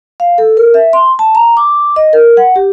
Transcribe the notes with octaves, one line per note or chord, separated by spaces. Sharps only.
F5
A4
A#4
E5
C6
A5
A#5
D6
D#5
A#4
F#5
G4